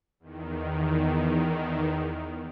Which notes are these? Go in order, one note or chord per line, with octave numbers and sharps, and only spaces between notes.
E2 D#3